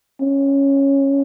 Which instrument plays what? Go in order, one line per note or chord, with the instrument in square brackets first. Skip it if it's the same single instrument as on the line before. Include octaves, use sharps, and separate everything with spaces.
[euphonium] C#4